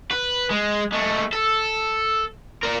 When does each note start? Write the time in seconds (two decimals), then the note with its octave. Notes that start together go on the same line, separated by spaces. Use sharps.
0.11 B4
0.50 G#3
0.93 G#3 A3
1.33 A4
2.63 A#4 D5